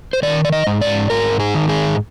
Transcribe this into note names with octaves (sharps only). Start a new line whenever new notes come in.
C5
D#3 D5
D5
D#5
G#2
D5
G#2 A#4
G#4
D#3
G#4